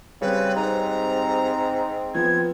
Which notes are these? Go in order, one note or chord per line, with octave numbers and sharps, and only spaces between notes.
C#3 G3 C4 B4
G#2 A#5
F3 B3 G#6